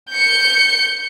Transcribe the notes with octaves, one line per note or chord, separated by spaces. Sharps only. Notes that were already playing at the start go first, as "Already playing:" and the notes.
G6 C#7